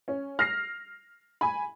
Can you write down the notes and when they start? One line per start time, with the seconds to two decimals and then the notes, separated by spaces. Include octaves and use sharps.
0.08 C#4
0.39 F6 A#6 C7
1.41 G#5 B5